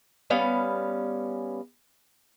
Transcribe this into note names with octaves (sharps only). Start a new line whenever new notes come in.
G3 B3 C#4 F5